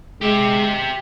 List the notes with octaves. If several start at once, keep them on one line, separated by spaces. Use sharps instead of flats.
G#3 G4 E5